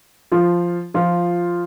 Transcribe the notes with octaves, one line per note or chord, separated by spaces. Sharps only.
F3 F4
F3 F4